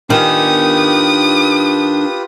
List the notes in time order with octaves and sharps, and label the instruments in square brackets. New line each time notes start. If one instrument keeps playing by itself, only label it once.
[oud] D#3 [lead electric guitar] D4 G#5 [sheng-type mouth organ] F4 G4 B4 [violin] D#6